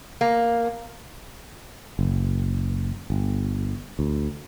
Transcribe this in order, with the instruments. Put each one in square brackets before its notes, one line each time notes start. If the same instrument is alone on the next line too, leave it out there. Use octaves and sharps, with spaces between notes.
[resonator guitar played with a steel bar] A#3
[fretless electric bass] F#1
G1
D2